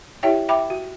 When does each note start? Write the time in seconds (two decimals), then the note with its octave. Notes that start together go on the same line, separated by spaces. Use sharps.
0.23 E4 G4 C#5 E5 G5
0.49 E5 G5 B5 D6
0.70 F#4